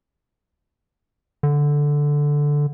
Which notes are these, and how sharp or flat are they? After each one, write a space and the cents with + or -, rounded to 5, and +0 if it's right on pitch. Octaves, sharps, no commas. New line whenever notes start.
D3 -5